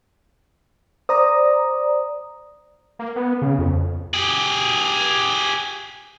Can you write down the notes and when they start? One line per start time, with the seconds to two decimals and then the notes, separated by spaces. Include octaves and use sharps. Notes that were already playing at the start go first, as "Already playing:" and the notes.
1.09 C5 D5 A#5 D#6
2.99 A#3
3.16 B3
3.42 C#3
3.58 F2
4.14 G4 G#4